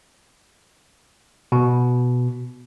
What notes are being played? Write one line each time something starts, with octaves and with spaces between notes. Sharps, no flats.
B2